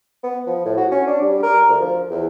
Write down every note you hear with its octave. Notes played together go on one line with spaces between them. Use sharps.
B3
F3
A2
F#4
C#4
D4
G3
A#4
D2
F3
E2